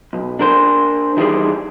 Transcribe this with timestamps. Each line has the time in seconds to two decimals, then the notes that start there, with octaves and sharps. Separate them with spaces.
0.13 B1
0.39 D4 A#4 C5
1.17 E3 G3 D#4 G#4 C5 D5